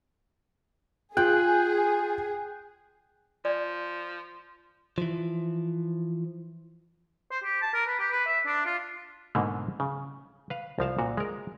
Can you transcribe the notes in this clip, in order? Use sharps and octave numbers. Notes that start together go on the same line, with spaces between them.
F4 G#4 G5 F#6
F3 D5
E3 F3
C5
G4
A5
A#4
B4
G4
B4
E5
D4
F4
G#2 B2 D3 A3 A#3
C#3
B4 F5
C2 F3 F5 A5
A#2 F#4
G#3 A#4